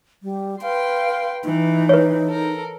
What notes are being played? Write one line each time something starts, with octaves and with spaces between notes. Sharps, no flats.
G3
B4 F5 G5 C6
E3 D#4
B4 C#5
A4 A#4